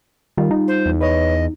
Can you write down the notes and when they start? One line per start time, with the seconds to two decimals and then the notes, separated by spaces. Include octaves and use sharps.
0.37 D#3 G3 F4
0.51 D#4
0.68 C5
0.86 E2
1.01 B4 C#5 D#5